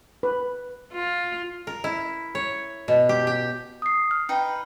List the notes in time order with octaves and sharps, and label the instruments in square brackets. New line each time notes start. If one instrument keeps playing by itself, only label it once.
[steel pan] B4
[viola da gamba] F4
[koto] A#4
E4
C#5
B2
G4
G4
[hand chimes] D#6 C7
F6
[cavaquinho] D#4 B4 G5